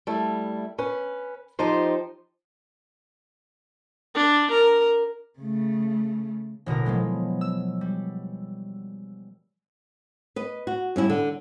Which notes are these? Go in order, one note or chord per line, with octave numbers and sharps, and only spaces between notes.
G3 A3 E4
C#4 B4
F3 D#4 G4 C5
D4
A#4
C#3 A3
A1 B2 D3 A#4
F3 F#3 G#3 B3
E6
G3
B4 D#5
F#4
G2 C#4 E4
D3